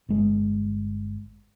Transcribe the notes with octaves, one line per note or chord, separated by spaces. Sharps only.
G1 G#3